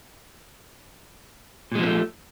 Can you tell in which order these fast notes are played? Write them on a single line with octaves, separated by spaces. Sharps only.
A#2 G#3 F3 B3 A3